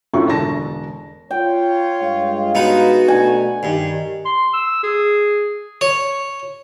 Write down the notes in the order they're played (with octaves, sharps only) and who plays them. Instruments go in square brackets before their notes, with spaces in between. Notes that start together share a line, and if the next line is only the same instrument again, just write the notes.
[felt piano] F#2 A2 D4 F4 C#6
E1 D3 A5 A#6
[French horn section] F4 C#5 [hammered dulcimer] G5
[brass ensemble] G2 G#3 F5
[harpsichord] B3 D#4 [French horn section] F#4 B4
[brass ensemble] B2 A3 D4 [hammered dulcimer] G#5
[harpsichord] G2 [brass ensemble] D#3
[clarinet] C6
E6
G#4
[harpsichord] C#5